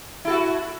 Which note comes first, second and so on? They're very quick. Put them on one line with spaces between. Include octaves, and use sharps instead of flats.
E4 A4 F#4